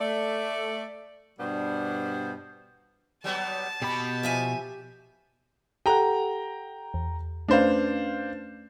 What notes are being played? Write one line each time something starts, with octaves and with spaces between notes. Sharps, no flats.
A3 D5
G2 B2 G3 B3 D4 C5
F#3 G3 B3 A5
B2 G4 B5
F3 E5 G#5
G4 A4 F#5 G5 A#5
E2
A3 C#4 D4 B4 C5 F5